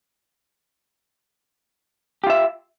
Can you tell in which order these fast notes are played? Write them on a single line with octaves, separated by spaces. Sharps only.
G4 F4 E5